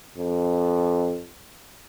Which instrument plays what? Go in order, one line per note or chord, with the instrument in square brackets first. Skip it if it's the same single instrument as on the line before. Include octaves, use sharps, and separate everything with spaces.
[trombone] F2